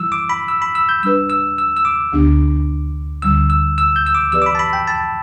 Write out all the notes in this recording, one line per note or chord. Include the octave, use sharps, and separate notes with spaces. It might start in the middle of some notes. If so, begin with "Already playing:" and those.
Already playing: E3 G3 E4 E6
D6
B5
E6
B5
E6
G6
G3 D4 B4 E6
E6
E6
E6
D6
D2 D3 B3 D4 G4
D2 D3 G3 E6
E6
E6
G6
E6
D6
E3 B3 G4 B4 D5 E6
D6
B5
A5
B5
G5
A5